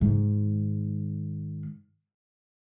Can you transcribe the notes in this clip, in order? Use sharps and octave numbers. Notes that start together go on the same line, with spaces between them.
G#2 D#3